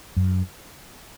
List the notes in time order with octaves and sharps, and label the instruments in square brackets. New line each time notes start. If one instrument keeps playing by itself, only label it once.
[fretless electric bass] F#2